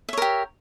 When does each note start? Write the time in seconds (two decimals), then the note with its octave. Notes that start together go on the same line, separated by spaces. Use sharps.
0.09 E5
0.13 C#5
0.17 A#4
0.22 G4